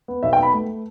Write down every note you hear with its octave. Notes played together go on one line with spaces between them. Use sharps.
B3
B1 E5
G5
B3 B5
A3